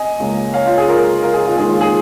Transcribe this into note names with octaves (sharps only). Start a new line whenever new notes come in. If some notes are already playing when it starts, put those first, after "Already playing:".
Already playing: D#5 G#5
C#2 C#3 A#3
C#5 F5
F4
G#4
F4 A#4
F4 A#4
G#4
F4
G#2 D#3 A#3 C#4 G#4
F4
G#4